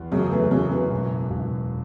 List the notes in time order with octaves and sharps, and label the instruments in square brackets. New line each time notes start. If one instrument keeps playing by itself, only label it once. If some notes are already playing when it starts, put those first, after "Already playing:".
Already playing: [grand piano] E2
[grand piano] F#2 [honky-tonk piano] C#3 F#3
[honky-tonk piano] E3 A3
[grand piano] F#2 [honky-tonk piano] C#3 F#3
[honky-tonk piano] E3
[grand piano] E1
E1